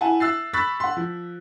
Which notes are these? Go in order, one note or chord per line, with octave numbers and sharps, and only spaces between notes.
E4 F#5 G#5 A5
E5 E6 F#6 A6 C7
B5 C#6 E6 F#6 A6 B6
F#5 C6
F3